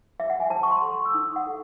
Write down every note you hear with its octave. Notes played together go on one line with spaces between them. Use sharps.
E5
F#5
G#5
C5 A5
C#6
C6
A4
C#6
E6
D#4 D#6
F#5
A4